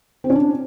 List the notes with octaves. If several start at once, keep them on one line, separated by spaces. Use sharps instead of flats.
C4
C#4
D4